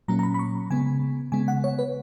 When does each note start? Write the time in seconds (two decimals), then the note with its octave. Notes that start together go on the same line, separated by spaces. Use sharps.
0.08 A#2 F#3 A#3 C#4 A#5
0.19 A#5
0.23 B5
0.34 B5
0.39 C#6
0.71 C#3 G#3 B3 G#5
1.32 C#3 G#3 B3 G#5
1.48 F#5
1.64 C#5
1.79 B4